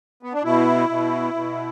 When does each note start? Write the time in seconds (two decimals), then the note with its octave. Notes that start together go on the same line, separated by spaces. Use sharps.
0.23 B3
0.33 D4
0.44 B2 E4
0.89 B2
1.34 B2